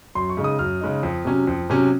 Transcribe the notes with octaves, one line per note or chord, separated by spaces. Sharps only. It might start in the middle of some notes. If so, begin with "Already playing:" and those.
F#2 C6
C#6
C#3 G#3 D#4
D#6
F#2 F6
C#3 G#3 D#4
F2
C3 F#3 C#4
F2
C3 F#3 C#4